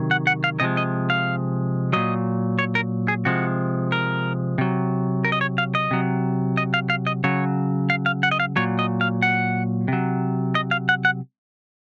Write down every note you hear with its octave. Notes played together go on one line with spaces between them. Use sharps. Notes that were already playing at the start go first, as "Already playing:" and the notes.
Already playing: C3 D#3 F#3
F#5
F#5
F5
C3 F3 G#3 D#5
D#5
F5
A#2 F#3 D#5
C#5
A#4
G#4
C3 F3 G#3 F#4
A#4
C3 F#3
A#4
D#5
C#5
F5
D#5
C3 F#3
D#5
F5
F5
D#5
C#3 F#3 C#5
F5
F5
F#5
D#5
F5
A#2 F#3 C#5
D#5
F5
F#5
C3 F#3
D#5
F5
F#5
F#5